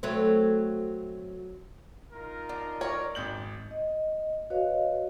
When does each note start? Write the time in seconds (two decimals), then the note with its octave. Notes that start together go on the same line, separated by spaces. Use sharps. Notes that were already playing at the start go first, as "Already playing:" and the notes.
0.03 F#3 A3 C4
2.12 D#4 F4 A#4
2.49 D4
2.81 C#5 D5 A#5
3.15 G#1 G6 F#7
3.71 D#5
4.50 F#4 B4 C#5 D#5 F5